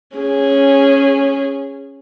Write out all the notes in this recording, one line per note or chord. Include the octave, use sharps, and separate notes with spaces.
C#4 G#4